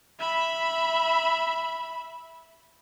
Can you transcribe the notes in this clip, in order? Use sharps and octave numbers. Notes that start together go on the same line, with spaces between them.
E5 B5